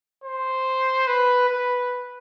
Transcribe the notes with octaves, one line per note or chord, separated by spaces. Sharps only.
C5
B4
B4